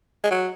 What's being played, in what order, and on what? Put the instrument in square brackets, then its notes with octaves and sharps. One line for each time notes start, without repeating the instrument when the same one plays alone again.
[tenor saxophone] G#3
F#3